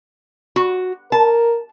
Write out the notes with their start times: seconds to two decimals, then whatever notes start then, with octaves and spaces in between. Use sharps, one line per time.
0.56 F#4
1.12 A#4 A5